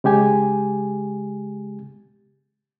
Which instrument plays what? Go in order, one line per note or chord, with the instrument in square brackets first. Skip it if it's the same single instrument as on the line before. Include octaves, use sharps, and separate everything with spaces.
[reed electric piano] C#3 G#3 G4 G#5